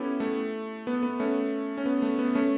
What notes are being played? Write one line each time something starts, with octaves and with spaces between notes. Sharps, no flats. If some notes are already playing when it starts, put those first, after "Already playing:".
Already playing: B3 C#4 E4 G4 A4
A3
B3
B3
A3 C#4
C#4
B3
A3
B3
A3 C#4